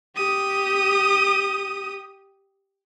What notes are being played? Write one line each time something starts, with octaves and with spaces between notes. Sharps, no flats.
G4 D#6